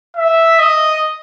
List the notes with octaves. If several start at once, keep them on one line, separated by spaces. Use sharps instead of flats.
E5
D#5